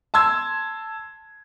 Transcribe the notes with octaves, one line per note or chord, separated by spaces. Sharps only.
A5 C6 E6 G#6